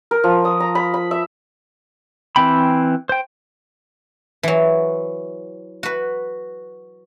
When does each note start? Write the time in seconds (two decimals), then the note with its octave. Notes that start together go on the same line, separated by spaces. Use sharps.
0.11 A#4
0.24 F3
0.45 D#6
0.60 A#5
0.75 B5
0.94 B5
1.11 E5
2.36 E3 C4 G5 B5
3.09 C5 G5
4.43 E3 F#3
5.83 F#4 B4